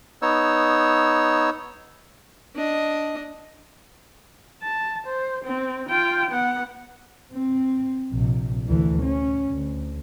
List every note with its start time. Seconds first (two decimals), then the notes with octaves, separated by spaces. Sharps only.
0.22 B3 D#4 C#5 E6
2.55 D4 D#5
4.62 A5
5.06 C5
5.44 C4
5.89 F4 G5
6.30 B3 F#5
7.32 C4
8.12 A#1 C3
8.66 D2 E3
9.03 C#4
9.50 D2